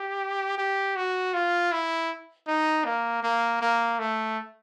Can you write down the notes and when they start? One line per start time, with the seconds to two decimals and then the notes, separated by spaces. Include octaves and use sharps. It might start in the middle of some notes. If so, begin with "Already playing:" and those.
Already playing: G4
0.58 G4
0.96 F#4
1.34 F4
1.72 E4
2.47 D#4
2.85 A#3
3.23 A#3
3.61 A#3
3.99 A3